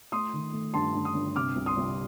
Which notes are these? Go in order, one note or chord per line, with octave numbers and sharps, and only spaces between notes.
A3 C6 D#6
D#3
A3
G2 A5 C6
G2
C6 D#6
G2
C3 D6 F6
C2
C6 D#6
C2